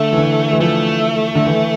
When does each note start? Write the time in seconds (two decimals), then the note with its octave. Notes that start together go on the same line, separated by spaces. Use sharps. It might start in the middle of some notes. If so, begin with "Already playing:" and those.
Already playing: D3 A3
0.13 E3
0.18 D3
0.53 E3
0.60 F3 A3
1.35 D3
1.46 E3